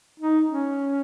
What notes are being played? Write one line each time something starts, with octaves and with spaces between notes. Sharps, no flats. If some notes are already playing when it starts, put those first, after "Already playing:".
D#4
C#4